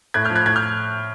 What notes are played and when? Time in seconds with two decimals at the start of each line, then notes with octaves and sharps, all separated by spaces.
0.14 A2 F#6 G#6
0.25 F6 G6
0.30 F3
0.35 F#6 G#6
0.46 A2 F#6 G#6
0.56 F6 G6